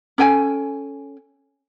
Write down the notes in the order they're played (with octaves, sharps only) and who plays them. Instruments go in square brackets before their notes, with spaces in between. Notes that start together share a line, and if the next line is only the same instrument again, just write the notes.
[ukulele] C#4 A4 G5 G#5